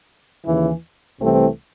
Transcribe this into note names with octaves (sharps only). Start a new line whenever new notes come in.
D#2 C#3 E3
C2 C3 E3 A3 C4